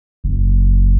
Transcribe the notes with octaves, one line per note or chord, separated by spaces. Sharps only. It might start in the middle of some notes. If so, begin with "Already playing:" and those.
F#1